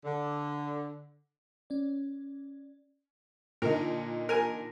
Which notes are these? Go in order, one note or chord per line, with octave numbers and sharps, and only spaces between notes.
D3
C#4 D5
A#2 D3 D#4 A#4
A#4 G#5